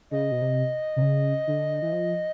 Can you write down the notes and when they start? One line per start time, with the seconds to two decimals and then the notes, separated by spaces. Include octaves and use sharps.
0.11 C#3 D#5
0.31 B2
0.42 C3
0.96 C3
1.02 C#3
1.47 D3
1.82 E3
1.93 F3